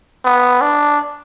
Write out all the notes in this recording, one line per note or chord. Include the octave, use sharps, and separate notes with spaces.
B3
D4